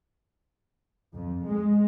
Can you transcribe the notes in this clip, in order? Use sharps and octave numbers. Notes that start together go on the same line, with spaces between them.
F2
G#3